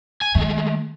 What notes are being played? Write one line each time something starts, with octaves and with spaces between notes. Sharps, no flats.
G#5
D#3 G#3 A3